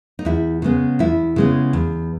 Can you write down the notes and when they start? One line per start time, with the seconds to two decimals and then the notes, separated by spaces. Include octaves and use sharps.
0.19 D#4
0.25 E2 E4
0.62 C#3 G#3 B3
0.99 E2 E4
1.36 C#3 G#3 B3
1.73 E2